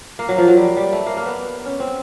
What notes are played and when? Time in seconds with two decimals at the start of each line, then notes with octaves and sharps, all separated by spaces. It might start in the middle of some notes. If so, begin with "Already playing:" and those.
0.19 A#3
0.29 F#3
0.38 F3
0.48 F#3
0.57 G3
0.77 G3
0.93 A3
1.06 A#3
1.17 A#3
1.26 B3
1.66 C#4
1.80 C4